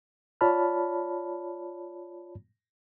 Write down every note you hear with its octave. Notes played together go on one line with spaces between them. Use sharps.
F4 C#5 D5 A5 B5 F6